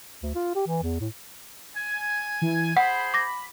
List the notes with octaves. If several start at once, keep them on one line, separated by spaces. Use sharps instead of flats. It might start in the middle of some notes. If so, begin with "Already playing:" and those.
D2
F4
G4
E3
E2
A2
G#5
E3
G#4 C5 F#5 B5
D6 A#6